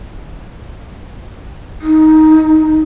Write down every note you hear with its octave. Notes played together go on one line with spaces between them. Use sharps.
D#4